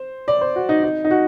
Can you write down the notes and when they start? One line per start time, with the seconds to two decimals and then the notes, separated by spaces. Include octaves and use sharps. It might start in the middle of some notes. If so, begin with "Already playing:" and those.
Already playing: C5
0.28 D5
0.41 C5
0.56 F#4
0.69 D#4
0.84 D#4
1.05 D#4
1.11 F#4